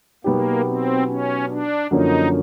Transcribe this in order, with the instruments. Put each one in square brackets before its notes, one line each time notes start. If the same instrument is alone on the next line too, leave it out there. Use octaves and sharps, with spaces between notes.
[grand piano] B2 F#3 B3 D#4 G4 [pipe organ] A#3
[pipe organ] C4
C#4
D4
[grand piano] F#2 D3 F3 A#3 C#4 [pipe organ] D#4